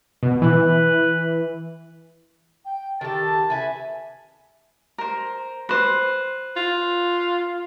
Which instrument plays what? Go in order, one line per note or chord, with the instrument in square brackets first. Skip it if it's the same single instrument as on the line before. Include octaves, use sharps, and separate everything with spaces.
[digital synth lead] B2
[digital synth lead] E3 [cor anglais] B4
[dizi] G5
[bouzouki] D#3 A4 [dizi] G4 [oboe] A5
[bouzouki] B4 G#5 [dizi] E5
[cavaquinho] A#4 C5
B4 C5
[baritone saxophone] F4